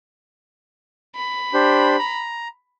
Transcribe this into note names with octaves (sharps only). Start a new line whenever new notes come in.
B5
D4 G4 C5
A#5